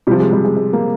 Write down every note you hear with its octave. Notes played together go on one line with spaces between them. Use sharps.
C3 F3 G3
G#3
G3
G#3
G#3
A#3